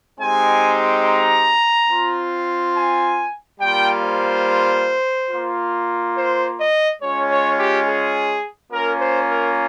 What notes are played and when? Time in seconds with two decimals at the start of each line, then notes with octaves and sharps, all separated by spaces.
0.19 G#3 C4 D#4 G4 G#5
1.05 A#5
1.90 C4 F4
2.75 G#5
3.60 G3 A#3 F4 G5
4.03 C5
5.30 A#3 F4
6.16 C5
6.58 D#5
7.01 G#3 C#4 F4 C#5
7.29 C#5
7.58 G4
7.86 G#4
8.72 A#3 C#4 F4 A#4
9.00 C5
9.29 A#4